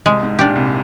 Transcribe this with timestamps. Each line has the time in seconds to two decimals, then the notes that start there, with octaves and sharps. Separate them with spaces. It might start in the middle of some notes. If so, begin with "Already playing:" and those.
0.06 C2 C3 G#3
0.23 G#2
0.39 A#2 D4 G4
0.56 C2 C3